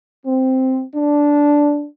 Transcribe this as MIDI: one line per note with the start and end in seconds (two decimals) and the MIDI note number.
0.25 0.82 60
0.95 1.85 62